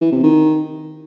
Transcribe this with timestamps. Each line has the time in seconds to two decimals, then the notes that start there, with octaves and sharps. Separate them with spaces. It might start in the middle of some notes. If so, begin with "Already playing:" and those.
0.01 E3
0.12 C3
0.23 D#3